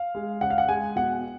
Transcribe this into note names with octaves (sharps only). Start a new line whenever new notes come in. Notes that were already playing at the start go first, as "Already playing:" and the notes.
Already playing: F5
G#3
C#3 F#5
F5
F#5
G#3 G#5
B2 F#5